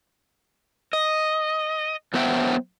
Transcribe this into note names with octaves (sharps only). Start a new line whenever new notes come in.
D#5
F#3 B3 C5 E5 F#5 G5